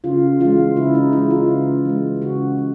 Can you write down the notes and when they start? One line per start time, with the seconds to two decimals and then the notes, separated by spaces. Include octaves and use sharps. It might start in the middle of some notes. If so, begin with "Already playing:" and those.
0.04 C#3 F4
0.40 E3 G#3 F4
0.76 C#3 E4
0.95 D#4
1.13 E3 G#3 E4
1.31 F4
1.49 C#3
1.85 E3 G#3
2.22 C#3 F#4
2.58 E3